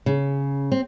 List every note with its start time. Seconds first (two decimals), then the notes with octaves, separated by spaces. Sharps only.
0.06 C#3
0.72 C4